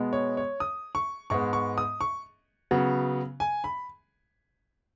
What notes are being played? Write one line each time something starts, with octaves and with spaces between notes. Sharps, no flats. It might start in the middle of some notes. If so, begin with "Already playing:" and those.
Already playing: B2 G#3 B3
C#5
C#5
D#6
C#6
G#2 G#3 B3 C#6
C#6
D#6
C#6
C#3 F#3 B3
G#5
B5